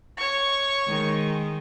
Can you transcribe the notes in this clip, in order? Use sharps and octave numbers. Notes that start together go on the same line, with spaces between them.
C#5 C#6
D#3 G#3